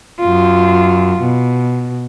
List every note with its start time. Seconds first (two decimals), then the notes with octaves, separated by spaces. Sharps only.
0.20 F#2 F4
1.21 B2